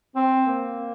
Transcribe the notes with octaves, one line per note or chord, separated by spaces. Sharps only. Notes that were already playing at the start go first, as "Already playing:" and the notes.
C4
A#3